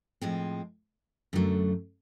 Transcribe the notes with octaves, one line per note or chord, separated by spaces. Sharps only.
A2 F3 G#3 C4
F#2 D3 F#3 A3